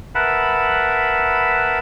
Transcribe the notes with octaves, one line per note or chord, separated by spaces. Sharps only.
A#4 B4 E5 F#5 A5 B5